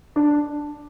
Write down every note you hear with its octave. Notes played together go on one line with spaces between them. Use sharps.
D4